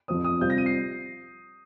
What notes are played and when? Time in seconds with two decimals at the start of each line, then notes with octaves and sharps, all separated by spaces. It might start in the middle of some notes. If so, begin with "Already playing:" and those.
0.08 F2 F3 C4 D#6
0.24 D#6
0.41 C3 G3 C4 F4 G6
0.50 A#6
0.58 D#7
0.66 C7